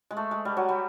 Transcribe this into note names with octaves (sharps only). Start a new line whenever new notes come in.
G#3
A3
G#3
G3
F#3
G3